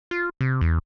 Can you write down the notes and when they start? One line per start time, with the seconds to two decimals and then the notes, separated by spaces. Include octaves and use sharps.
0.11 F4
0.41 C3
0.61 E2